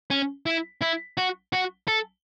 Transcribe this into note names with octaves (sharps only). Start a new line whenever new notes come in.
C#4
E4
E4
F#4
F#4
A4